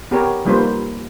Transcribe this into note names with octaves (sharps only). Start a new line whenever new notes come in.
B3 G4 A#4 C#5
F3 G3 A#3 D#4 B4 C5